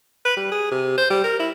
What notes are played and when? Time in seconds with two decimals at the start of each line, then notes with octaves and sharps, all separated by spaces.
0.25 B4
0.36 G3
0.51 G#4
0.71 C3
0.97 C5
1.10 G3
1.24 A#4
1.39 E4